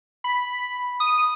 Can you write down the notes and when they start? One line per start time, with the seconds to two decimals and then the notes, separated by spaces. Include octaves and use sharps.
0.24 B5
1.00 D#6